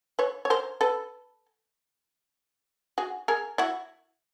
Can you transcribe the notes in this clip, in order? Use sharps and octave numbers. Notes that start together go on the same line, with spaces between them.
B4 C#5
C#5
A#4 C5
A4 B4
F#4 G#4
G#4 A#4
E4 F#4